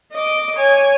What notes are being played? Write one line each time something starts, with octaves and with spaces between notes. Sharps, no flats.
D#5 D6
C#5 G#5